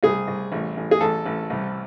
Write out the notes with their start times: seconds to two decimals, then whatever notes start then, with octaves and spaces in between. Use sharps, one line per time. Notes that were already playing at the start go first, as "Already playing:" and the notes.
0.03 C2 G#4
0.28 C2
0.52 A1
0.77 A1
0.91 G#4
1.01 A1 A4
1.25 A1
1.50 C2